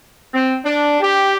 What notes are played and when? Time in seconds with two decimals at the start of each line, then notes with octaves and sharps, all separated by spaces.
0.32 C4
0.63 D4
1.00 G4